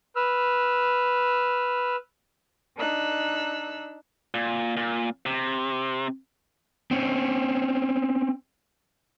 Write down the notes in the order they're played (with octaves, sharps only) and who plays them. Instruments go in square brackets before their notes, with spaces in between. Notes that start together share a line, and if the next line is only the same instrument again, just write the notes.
[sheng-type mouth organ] B4 E6 F6
[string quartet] D4 D#4 E6 F#6
[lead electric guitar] A#2
A#2
C3
[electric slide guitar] C4 C#4